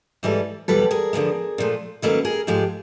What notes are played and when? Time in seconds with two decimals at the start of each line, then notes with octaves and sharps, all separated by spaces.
0.23 G#2 E3 G3 A4 B4
0.68 E2 B2 G3 A4 B4
0.91 G#4 A#4
1.13 D3 F3 G#3 B3
1.58 A#2 F3 A3
2.02 D#3 F#3 A#3 C#4 A4 B4
2.25 G#4 A#4
2.47 G#2 F3 G#3 G4 A4